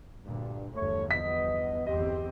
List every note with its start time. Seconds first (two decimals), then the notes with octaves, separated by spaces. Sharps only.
0.25 D2 G2 A#2
0.74 G1 E2 F3 A3 C#5
1.11 B3 D#5 B6
1.86 G1 E2 C4 G4 D#5